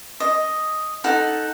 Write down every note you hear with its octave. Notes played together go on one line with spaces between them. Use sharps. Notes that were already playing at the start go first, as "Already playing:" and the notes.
D#5
D#4 A4 F#5